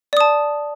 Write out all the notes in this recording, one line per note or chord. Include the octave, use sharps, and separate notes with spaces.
D5 A5 D#6